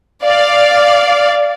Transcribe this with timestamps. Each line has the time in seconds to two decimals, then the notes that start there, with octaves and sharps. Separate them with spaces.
0.24 D5 F5